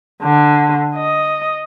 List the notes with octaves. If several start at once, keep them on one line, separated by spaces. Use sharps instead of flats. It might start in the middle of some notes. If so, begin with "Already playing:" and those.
D3
D#5